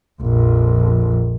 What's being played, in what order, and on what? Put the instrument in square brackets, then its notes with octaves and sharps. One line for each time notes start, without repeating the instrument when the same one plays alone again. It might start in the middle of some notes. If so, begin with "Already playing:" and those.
[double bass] A#1 F2